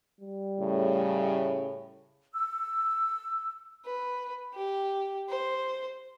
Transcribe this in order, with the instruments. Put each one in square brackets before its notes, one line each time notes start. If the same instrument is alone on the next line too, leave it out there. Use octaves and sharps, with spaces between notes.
[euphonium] G3
[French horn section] A2 C#3
[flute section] E6
[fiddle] B4
G4
C5